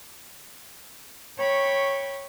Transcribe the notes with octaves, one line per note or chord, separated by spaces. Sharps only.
C#5 G5 B5 C#6